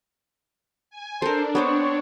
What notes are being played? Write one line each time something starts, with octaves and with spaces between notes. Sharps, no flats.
G#5
D4 A4 A#4 C5
B3 C4 C5 C#5 D6